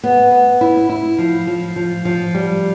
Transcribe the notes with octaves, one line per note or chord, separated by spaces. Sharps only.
B3
B3
E4
E4
F3
F3
F3
F3
G3